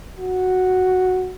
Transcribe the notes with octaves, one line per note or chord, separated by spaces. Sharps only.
F#4